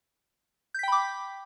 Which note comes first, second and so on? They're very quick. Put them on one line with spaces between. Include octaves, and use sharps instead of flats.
G6 B6 G5 B5 D6